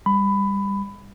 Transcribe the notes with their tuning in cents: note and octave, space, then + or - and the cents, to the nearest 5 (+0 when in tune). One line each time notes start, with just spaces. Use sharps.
G3 +15 B5 +15